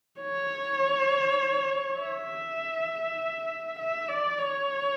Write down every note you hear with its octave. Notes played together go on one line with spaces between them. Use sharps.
C#5
E5
E5
D5
C#5